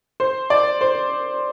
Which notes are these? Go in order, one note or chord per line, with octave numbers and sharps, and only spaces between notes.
C5
D5
C5